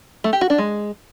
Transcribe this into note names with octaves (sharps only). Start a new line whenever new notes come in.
A3
G4
F#4
D4
G#3